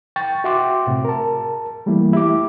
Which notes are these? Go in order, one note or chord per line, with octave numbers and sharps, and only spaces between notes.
G5 C#6 A6
F#4 E5 F#5 G5 C6 D6
A2 C3
A#4 A5
E3 G3 A3 A#3 E4
E4 G4 D6